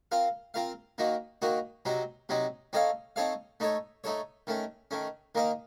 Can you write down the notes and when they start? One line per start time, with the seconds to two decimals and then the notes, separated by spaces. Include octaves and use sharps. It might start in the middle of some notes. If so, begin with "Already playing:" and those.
0.11 C4 F4 A#4 F5
0.54 C4 F4 A#4 F5
0.98 D#3 A#3 D#4 F#4
1.42 D#3 A#3 D#4 F#4
1.85 C3 F#3 C4 D#4
2.29 C3 F#3 C4 D#4
2.73 C4 D#4 A4 C#5 F5
3.16 C4 D#4 A4 C#5 F5
3.60 A3 D#4 A4 C#5
4.04 A3 D#4 A4 C#5
4.47 D#3 A3 C#4
4.91 D#3 A3 C#4
5.35 D#3 A#3 D#4 A#4 F5